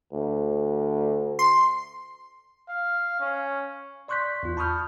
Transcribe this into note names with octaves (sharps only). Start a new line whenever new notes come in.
D2
C6
F5
C#4
D5 C6 C#6 F#6 G6 B6
E2 F4
A5 B5 C#6 D#6 F6 G6